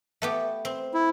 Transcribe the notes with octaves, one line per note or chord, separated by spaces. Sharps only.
A3 B3 G4
C4
E4